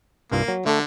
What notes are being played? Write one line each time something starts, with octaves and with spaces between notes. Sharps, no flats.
C2 G2 A#3 F4
F#3
D3 A3 A4